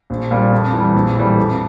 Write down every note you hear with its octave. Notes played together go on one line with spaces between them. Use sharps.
A#1
A#2 G3
F2
E3 G3
A#1
A2 E3 G3
F2